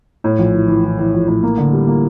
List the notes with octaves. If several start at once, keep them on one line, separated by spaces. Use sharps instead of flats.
A2
A#1
E3
E3
E3
E3
A#1
A2
A#3
D3
G3
A#3